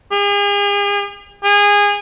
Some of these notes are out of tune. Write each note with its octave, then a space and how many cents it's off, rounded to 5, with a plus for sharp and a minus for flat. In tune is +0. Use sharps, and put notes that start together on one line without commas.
G#4 -40
G#4 -25